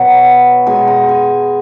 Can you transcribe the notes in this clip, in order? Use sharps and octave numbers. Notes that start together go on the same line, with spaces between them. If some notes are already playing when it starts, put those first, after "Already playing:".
Already playing: B2 F#3 A#5
B2 G#3 G#5
A#5
G#5